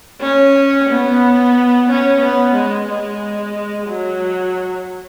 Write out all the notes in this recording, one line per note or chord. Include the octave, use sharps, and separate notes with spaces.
C#4
B3
C#4
B3
G#3
G#3
F#3